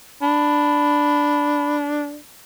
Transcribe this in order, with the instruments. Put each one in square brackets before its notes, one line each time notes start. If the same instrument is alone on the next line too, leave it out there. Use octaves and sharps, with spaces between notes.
[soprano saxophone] D4 [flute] B5